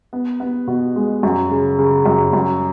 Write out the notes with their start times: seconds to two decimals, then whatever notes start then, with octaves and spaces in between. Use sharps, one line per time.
0.13 B3
0.40 B3
0.67 B2
0.96 G#3
1.23 F#2
1.51 C#3
1.79 C#3
2.06 F#2
2.33 F#2